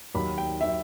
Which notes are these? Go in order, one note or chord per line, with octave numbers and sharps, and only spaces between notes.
D#2 D#3 F#3 B5
G5
D#3 F#3 E5